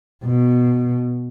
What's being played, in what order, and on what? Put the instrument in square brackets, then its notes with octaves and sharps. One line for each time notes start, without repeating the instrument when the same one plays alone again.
[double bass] B2